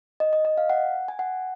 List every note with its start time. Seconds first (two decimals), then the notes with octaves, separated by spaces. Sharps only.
0.20 D#5
0.33 D#5
0.45 D#5
0.58 F5
0.70 F#5
1.08 G#5
1.19 F#5